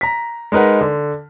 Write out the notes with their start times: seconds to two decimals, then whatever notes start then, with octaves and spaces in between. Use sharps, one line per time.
0.01 A#5 B6
0.52 G#3 D#4 A#4 B4 F#5
0.81 D3